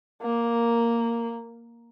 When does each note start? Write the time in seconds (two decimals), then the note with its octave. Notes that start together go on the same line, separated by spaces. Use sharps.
0.22 A#3